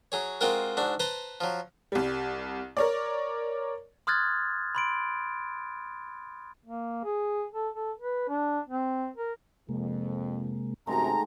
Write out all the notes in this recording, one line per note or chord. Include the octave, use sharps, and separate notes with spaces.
F#3 G#4 C#5
G#3 C4 F4 F#4 A#4
G#2 D4 F#4
B4 C5 A5 A#5 C6
F3 F#3
C2 G3
A#4 C#5 D5
C6 D#6 F6 F#6 G#6 A6
B5 C6 D7
A#3
G#4
A4
A4
B4
D4
C4
A#4
F2 C3 G#3 A#3
F#2 C3 D#3 G#3 A3 A#5